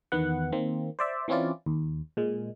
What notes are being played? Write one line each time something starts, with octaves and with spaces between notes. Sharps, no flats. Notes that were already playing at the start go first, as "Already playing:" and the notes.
E2 D#3 B3 F#5
D#3 A#3 C4
C5 D5 E5
E3 C4 C#4 E4 F4 D5
D#2
A#2 G#3